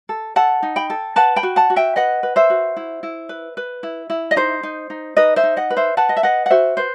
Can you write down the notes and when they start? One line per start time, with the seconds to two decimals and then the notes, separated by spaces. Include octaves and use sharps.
0.09 A4
0.36 A4 F#5 A5
0.63 D#4
0.76 G5 B5
0.90 A4
1.16 B4 F#5 A5
1.36 G5 B5
1.43 F#4
1.56 F#5 A5
1.70 F#4
1.76 E5 G5
1.96 B4 D#5 F#5
2.23 B4
2.36 C5 E5
2.50 F#4
2.77 E4
3.03 E4
3.29 B4
3.57 B4
3.83 E4
4.10 E4
4.31 D#5
4.36 D#4 C5
4.63 D#4
4.90 D#4
5.17 D#4 B4 D#5
5.36 C5 E5
5.43 D#4
5.57 D#5 F#5
5.70 B4
5.77 C5 E5
5.97 B4 F#5 A5
6.09 D#5
6.17 E5
6.23 B4 D#5 F#5
6.46 F#5
6.50 F#4 C5 E5
6.77 B4 C5